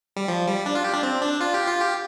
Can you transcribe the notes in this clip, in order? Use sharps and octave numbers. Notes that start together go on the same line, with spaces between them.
G3
F3
G3
D4
F4
G4
D4
C4
D4
F4
G4
F4
G4